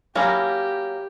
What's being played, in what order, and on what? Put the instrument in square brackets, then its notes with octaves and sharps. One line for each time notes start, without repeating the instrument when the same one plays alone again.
[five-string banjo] F#3 A#3 C#4 E4 [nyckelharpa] G4